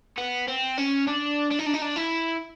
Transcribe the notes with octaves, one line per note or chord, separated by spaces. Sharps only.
B3
C4
C#4
D4
D4
D#4
D4
D#4
D4
E4